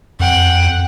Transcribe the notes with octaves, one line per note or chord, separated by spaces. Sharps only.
F2 F#5 G5